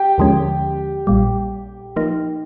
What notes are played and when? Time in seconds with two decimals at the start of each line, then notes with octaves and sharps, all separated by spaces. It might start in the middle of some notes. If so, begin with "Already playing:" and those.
Already playing: G4 G5
0.18 D#2 D3 F3 G#3 C#4
1.07 A#1 A#2 G3
1.96 F3 A#3 D#4